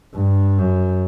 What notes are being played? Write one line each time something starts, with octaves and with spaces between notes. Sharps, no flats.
G2
F#2